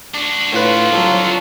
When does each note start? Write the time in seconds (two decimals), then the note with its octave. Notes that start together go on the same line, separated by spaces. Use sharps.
0.14 D4 F#4 D6
0.53 A2 F4 B4
0.93 F2 F#3